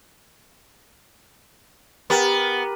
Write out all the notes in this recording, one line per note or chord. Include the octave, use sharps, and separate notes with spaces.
B3 G4 A#4